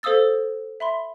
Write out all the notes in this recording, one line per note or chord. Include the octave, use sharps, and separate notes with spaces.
A4 C5 F5 D#6 E6 A6
E5 B5 C6